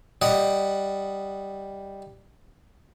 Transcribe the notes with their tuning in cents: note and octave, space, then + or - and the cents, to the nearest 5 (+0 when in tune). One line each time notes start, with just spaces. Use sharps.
G3 +0 D#5 +0 F#5 +0